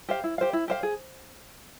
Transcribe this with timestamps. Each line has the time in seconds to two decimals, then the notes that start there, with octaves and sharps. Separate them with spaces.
0.09 G4 C5 F5
0.24 E4
0.38 G4 C5 F5
0.53 E4
0.68 G4 C5 F5
0.83 G#4